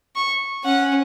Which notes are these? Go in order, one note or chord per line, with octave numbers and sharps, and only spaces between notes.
C#6
C#4 F#5